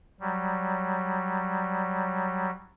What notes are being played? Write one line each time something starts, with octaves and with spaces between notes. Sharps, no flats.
F#3 G3